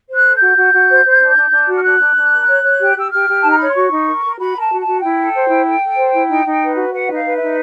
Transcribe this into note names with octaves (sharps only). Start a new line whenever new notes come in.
C5
F#6
A4
G6
F#4
F#4
F#4
C5
C5
D4
D4
D4
F#4
F6
D4 F#6
D4
D4
A#4
C#5
C#5
G4
G4 E6
G4 F6
G4
D#4 A5
A#5
C#5 B5
C6
F#4 C#6
D#4
A#4
A#4
F#4 B5
A#4
A5
F#4
A5
F#4
E4 G5
A4
C5
E4
A4
A4
C5
E4
D#4
D#4
B4
F#4
B4 F#5
D#4
F5
B4
E5
D#4